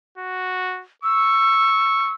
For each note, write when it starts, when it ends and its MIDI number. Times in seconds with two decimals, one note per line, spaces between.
0.18 0.83 66
1.03 2.13 85
1.03 2.13 88